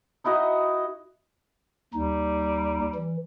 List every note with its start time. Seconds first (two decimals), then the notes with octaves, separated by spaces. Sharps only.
0.24 D#4 E4 F#4 D#5
1.94 D#2 G3 D#4
2.95 E3